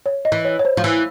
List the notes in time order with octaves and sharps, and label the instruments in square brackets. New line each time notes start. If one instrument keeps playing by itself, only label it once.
[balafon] C#5
D#5
[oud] E3
[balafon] C#5
C#5
C5
[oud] F3
E3